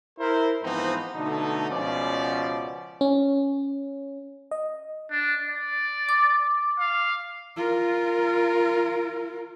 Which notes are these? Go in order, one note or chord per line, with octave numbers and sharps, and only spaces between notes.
E4 A#4 C5
G#2 E3 F3 B3 C4 D#4
B2 D3 A3 D#4
C#2 B2 F3 C#4 D5
C#4
D#5
D4
D5
D6
F5
F4 A#4